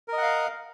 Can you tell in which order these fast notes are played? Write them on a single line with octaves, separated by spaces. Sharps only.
A#4 D#5 F#5 F5